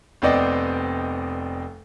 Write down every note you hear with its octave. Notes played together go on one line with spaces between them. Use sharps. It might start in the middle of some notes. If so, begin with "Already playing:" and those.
F1 B3 C4 D5 D#5 G5